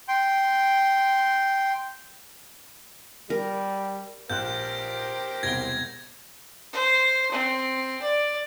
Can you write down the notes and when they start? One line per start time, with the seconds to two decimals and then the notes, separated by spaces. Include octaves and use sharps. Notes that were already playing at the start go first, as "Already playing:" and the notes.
0.08 G5 C6
3.30 G3 A#4
4.30 A#1 G4 A#4 C5 F#6 G6
5.43 E1 C2 G#6 A#6 G7
6.73 C5
7.31 C4
8.02 D5